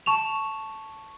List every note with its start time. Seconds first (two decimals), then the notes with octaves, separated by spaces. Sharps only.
0.06 A5 C#6 E7 F7